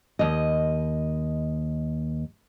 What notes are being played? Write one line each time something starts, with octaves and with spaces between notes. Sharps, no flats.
D#2 D#5